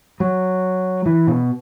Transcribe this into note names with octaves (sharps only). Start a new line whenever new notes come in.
F#3
E3
B2